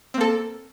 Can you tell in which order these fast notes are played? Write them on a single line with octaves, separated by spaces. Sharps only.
C4 A#3 A4